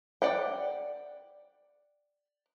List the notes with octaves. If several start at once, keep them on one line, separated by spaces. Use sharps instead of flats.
D5 F#5 G5